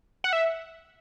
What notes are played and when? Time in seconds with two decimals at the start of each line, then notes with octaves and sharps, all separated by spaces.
0.24 F#5
0.33 E5